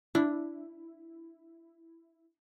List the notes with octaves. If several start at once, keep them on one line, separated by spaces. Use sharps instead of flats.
D4 E4